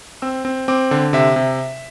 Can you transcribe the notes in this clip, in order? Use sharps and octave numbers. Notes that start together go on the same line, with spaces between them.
C4 E6
C4
C4 D6
D3
C3 E5
C3